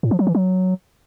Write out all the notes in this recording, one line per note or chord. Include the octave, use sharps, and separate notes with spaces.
A2
F3
F#3
E3
F#3